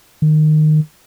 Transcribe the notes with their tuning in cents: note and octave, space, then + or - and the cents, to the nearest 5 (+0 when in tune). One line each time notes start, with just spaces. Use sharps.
D#3 -20